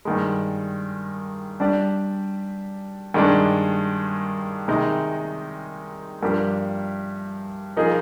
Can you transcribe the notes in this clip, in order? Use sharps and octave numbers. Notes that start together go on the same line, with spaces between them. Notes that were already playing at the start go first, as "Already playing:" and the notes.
G2 D#3 G#3
G3 D4 G4 D5
G2 D#3 G#3 D4
C3 D#3 G#3 D#4
G2 F3 A#3 D4 G4
F3 A#3 D#4 G#4